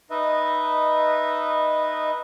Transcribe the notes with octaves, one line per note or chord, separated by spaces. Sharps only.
D#4 B4 D#5 E5